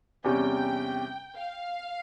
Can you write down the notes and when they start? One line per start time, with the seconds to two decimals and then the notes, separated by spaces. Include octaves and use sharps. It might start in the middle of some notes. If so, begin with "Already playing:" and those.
0.24 E2 C3 G3 C#4 G5
1.35 F5